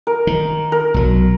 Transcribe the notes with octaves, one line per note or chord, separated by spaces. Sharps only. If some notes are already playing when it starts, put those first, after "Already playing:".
A#4
D#3
A#4
B1 F#3